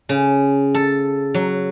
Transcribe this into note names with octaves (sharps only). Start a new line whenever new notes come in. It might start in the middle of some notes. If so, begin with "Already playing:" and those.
C#3
A4
F#3